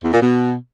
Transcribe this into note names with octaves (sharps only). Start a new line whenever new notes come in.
E2
A#2
B2